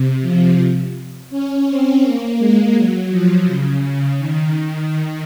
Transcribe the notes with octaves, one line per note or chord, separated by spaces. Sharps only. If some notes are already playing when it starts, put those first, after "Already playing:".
Already playing: C3
F3
C#4
C4
A#3
G#3
F#3
F3
C#3
C#3
D#3